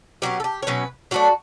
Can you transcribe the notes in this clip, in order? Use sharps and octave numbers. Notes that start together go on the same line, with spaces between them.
B2 F#3 C#4 G4
A4
G4
C#5
B2 F#3 C#4 B4
F#3 A3 D4 F#4